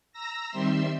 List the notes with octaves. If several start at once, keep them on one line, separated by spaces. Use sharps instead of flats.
A#5 E6 A#6
D#3 G3 C4 E5 C6 E6